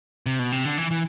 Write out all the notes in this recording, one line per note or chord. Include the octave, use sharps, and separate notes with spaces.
C3
B2
C3
D3
E3
E3